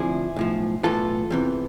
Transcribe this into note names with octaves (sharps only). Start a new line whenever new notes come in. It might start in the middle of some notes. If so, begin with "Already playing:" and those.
Already playing: D2 C3 F3 E4 G#4
B1 A2 F3
B1 A2 E3 F4 A4
E2 C3 E3